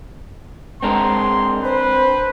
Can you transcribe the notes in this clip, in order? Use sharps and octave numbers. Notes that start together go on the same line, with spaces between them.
G#3 C4 D4 A#4 C6
B4 C5